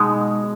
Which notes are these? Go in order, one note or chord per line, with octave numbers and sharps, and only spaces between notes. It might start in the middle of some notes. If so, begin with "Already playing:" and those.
Already playing: B2 G#3 D#4